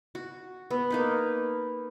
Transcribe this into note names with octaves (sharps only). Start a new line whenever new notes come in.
F#4
B3
A#3 D#4 B4